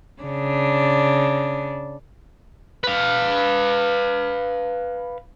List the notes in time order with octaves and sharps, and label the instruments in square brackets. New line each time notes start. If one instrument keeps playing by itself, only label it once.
[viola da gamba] C#3 D4
[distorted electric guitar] B4 F5